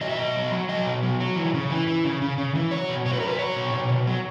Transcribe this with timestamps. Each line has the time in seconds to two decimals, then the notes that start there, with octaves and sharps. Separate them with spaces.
0.01 F#3 D#5
0.09 E5
0.18 B2 D#5
0.36 F#3
0.52 F#3
0.69 F#3 D#5
0.86 B2
1.03 F#3
1.20 F#3
1.36 E3
1.54 C#3
1.70 E3
1.87 E3
2.04 C#3
2.22 C#3
2.38 C#3
2.55 E3
2.71 F#3 C#5
2.89 B2
3.06 F#3 C#5
3.13 B4
3.20 F#3 A#4
3.27 B4
3.39 F#3 C#5
3.56 B2
3.73 B2
3.90 B2
4.07 F#3